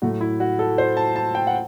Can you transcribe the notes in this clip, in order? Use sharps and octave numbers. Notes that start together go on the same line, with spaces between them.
A2 F#3 A3 F#4
E4
F#4
A4
C5
A5
A5
G5
F#5